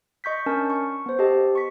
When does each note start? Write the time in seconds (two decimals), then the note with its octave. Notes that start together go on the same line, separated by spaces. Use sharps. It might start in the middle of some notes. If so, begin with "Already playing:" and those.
0.24 D#5 C#6 G6 B6
0.46 C#4 D4 A#4 G#5 A5
0.70 C#6
1.06 B3 C5
1.19 G4 A4 D#5 A5
1.55 C#6 B6